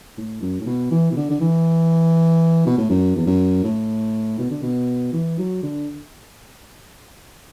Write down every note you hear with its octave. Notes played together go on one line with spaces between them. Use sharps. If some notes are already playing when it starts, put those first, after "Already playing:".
A2
F#2
A2
B2
E3
B2
D3
D3
E3
B2
A2
F#2
E2
F#2
A2
B2
D3
B2
E3
F#3
D3